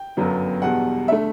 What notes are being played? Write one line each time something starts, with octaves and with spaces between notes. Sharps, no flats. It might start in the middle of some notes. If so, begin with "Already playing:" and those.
Already playing: G5
G1 F#2 F#3 B3
E2 B2 G3 F#5
E5
D3 A3